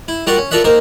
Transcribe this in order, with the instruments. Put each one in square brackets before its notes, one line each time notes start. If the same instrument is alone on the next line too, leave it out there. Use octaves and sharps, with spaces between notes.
[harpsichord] E4
G3 F4 F#4 A#4 D5 F#5
C#4
F4 A4 A#4 D5 E5 F#5
D#3 A#3 A#4 C5